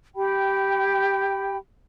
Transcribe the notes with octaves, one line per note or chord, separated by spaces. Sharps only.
G4 G5 B5